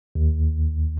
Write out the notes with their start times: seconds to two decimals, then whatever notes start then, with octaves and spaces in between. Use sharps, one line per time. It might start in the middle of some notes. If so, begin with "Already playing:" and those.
0.15 D#2